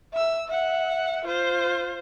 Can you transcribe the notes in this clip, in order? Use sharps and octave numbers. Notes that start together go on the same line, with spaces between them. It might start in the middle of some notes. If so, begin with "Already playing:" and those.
E5 E6
E5 F#5
F4 C5